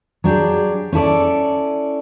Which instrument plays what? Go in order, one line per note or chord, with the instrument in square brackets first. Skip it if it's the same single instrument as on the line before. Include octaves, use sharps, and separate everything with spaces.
[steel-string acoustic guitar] F#3 D4 G4 G#4
C#4 E4 A4 D5